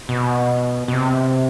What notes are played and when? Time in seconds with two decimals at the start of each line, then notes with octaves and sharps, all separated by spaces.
0.09 B2
0.88 B2
0.93 C3